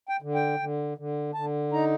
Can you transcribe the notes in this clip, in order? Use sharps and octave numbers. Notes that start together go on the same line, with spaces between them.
G5
D3
G5
D3
D3
D3 A5
D#4 A#5